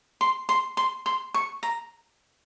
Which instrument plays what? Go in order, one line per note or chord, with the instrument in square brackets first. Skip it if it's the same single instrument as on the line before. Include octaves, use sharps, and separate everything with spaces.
[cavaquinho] C6
C6
C6
C6
C#6
A#5